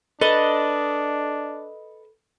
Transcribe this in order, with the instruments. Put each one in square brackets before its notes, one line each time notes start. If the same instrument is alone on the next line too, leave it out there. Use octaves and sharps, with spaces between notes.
[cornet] D4 [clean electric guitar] A4 B4 [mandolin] D#5